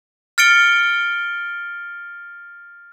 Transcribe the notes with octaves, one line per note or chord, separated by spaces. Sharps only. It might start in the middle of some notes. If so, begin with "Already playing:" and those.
F6 A6 C#7 D7 G7